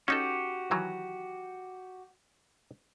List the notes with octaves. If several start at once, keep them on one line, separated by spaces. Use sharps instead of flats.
C#4 D#4 F#4 G4 A4
D#3 E3 F#3